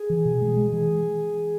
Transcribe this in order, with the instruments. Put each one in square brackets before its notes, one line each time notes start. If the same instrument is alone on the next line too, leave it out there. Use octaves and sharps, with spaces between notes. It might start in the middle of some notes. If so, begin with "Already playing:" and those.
Already playing: [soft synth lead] G#4
[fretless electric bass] E3
B2
G#3
G#3
[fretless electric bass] E3 [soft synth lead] G#4